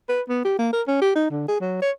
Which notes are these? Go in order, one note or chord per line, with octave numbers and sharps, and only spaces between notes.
B4
B3
G4
A#3
A#4
C#4
G4
D#4
D3
G#4
F#3
C#5